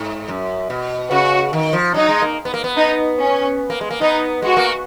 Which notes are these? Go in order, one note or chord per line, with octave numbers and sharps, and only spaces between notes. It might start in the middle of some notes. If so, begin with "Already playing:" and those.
Already playing: G#2
F#2
B2
C#3 F#4
D#3
F3
F#3 D#4
G#3
A#3
B3
A#3
B3
D#4
C#4
A#3
G#3
A#3
B3 D#4
G#3 F#4
A#3